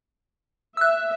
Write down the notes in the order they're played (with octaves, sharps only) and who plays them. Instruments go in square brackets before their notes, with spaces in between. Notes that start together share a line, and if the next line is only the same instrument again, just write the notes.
[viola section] E5 [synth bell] E6 F#6